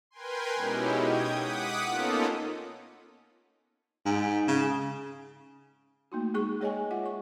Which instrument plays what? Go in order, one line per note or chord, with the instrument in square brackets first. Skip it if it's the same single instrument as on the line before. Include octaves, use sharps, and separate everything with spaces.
[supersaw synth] A#4 B4 G5 G#5 C6
B2 G#3 C#4 D#4 E4 G4
G5 D#6 G#6
F#5 D6 D#6 B6
A#3 B3 C#4 D#4 F4 A4
[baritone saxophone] G#2
C#3
[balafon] A3 A#3 D#4 F#4
G#3 G#4 C#6
G#3 G#4 C#5 D#5 G5 G#5
F4 G#4 E5 F#5
C#5 C#6